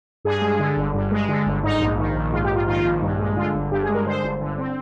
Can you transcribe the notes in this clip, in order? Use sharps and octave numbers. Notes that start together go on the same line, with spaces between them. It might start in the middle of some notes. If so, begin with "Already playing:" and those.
G2 G#4
G#3
D3
G1
G2
G#3
D3
G1
G#2 D#4
A#1
D#3
A#1
G#2 F4
G4
A#1
F4
D#3 F4
A#1
G2
G#3
D3 F4
G1
G2 G4
G#4
G#3
A#4
D3 C5
G1
D3
C4